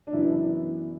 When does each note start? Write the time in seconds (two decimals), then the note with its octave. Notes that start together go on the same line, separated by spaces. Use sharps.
0.07 D4
0.13 F#2 E3 B3 E4